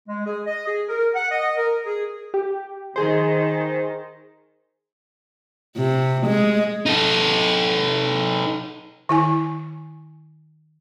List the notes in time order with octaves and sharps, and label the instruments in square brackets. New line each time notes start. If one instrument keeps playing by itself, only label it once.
[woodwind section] G#3
G#4
D#5
G#4
A#4
F#5
D#5
A#4
G#4
[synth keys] G4
[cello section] D#3 [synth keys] G#4 C5
[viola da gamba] C3
G#3
[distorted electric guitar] D#4 A4
[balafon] D#3 E4 G#5